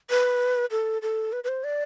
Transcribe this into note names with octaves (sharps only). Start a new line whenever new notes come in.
B4
A4
A4
B4
B4
C5
D5